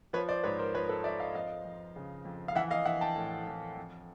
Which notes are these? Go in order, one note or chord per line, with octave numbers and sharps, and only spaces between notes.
F3 B4 C#5
C5 D5
G#2 B4 C#5
A#4 C5
F3 B4 C#5
A4 B4
F3 D5 E5
D#5 F5
F2 D#5 F5
F2
C#3
F2
F5
E3 E5 F#5
D#5 F5
E3 E5 F#5
G5 A5
A2
E3
F2